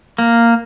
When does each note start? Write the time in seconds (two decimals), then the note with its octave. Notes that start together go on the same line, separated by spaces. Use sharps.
0.18 A#3